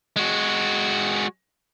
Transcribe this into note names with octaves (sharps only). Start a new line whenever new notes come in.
G#3 F#4